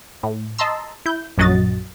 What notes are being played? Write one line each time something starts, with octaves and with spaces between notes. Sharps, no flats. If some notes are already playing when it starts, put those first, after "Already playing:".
A2
D#5 A5 A#5 C6 E6
E4 G6
A#1 F#2 F#3 F#4 D#5 A6